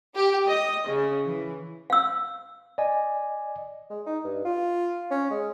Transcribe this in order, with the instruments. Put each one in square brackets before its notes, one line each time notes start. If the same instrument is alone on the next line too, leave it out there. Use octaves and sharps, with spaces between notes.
[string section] G4
D#5
C#3
E3
[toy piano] F5 E6
[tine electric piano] D5 D#5 G#5
[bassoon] G#3
D#4
G2
F4
C#4
G#3